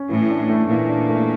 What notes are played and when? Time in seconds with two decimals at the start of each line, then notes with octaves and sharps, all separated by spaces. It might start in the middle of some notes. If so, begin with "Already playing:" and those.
Already playing: C#4
0.09 A2 E3
0.30 D4
0.49 A3
0.69 A#2 E3
0.89 D4
1.09 A3